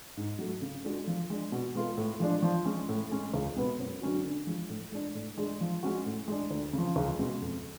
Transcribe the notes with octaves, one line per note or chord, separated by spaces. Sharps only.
G#2
F#3 A3
C#3
G#3 D4 F#4 A4
F3
G#3 D4
B2
G#3 B3 F4 A4
A2
F3 G#3 D4
F3
G#3 C#4
A2
G#3 C#4
C#2
B2 G#3 B3
F#2
D3 F#3 C#4 F#4
D3
F3 G#3
A2
G#3 D4
A2
G#3 D4 G#4
F3
G#3 C#4 F#4
A2
G#3 D4
D2
C#3
F3
C#2
B2 G#3 C#4
F2